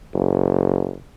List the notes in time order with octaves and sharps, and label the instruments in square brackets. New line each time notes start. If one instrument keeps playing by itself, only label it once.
[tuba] F#1